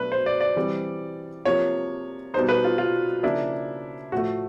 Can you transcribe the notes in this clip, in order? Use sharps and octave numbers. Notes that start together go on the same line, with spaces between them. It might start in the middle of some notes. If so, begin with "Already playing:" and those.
Already playing: B2 F#3 A3 D4 B4
C5
D5
D5
E3 G3 C4
C3 F3 A#3 C#5
B2 G3 B3 D#4 C5
B4
F4
F4
C#3 F3 A#3 D4 E4
A2 F3 A3 F#4